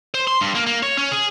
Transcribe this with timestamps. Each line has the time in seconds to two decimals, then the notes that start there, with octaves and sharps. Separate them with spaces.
0.14 C5
0.27 C6
0.41 G2
0.55 A#3
0.67 A#3
0.83 C#5
0.97 C#4
1.11 G#4